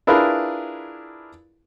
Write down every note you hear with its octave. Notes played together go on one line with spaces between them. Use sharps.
D4 E4 F4 G#4 A#4 B4